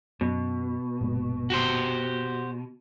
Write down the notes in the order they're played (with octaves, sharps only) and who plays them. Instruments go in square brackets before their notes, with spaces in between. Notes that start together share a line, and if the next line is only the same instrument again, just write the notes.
[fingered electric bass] F#2 [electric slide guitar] B2
[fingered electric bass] F#1 A#2 G#3
[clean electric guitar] F#4 G4 C5